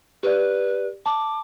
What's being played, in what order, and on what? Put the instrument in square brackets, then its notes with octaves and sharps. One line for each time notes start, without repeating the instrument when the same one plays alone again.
[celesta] G4 D5 [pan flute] B4
[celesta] A5 [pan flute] D6